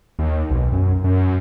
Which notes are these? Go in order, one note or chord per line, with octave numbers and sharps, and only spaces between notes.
D#2
B1
F#2
F#2